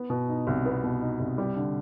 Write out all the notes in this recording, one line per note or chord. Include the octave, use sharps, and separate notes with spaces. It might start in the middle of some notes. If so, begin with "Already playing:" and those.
Already playing: B3
B2
D#4
C2
B3
B2
D#4
C2
G3
D3